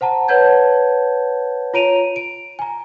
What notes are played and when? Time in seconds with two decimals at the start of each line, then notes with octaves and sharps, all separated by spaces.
0.01 C5 F#5 A5 A#5
0.28 B4 C#5 F#5 A5 G6 G#6
1.74 F4 C#5 A#5 D7 D#7 F7
2.16 D7
2.59 G#5 A#5